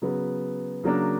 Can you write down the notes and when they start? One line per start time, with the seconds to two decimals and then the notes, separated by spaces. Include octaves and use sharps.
0.02 C#3 F#3 B3
0.84 C#3 F#3 A#3 D4